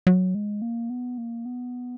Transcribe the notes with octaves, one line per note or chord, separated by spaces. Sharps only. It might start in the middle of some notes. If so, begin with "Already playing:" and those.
F#3
G#3
A#3
B3
A#3
B3